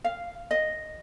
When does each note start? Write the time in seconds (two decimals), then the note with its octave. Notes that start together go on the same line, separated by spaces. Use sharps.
0.04 F5
0.51 D#5